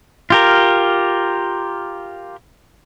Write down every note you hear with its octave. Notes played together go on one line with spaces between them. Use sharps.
F4 G4 A#4